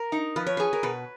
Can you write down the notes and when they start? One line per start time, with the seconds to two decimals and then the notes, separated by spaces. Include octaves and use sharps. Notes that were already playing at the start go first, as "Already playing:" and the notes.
Already playing: A#4
0.12 D#4
0.36 F3 B4
0.47 C#5
0.57 G#4 B4
0.73 A#4
0.83 B2 B4